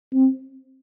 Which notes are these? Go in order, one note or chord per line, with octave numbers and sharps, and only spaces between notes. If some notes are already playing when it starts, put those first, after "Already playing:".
C4